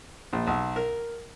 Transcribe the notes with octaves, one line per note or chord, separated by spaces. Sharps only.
A#1
B1
A#4